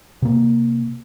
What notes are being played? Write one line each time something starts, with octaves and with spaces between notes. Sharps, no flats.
C3 A#3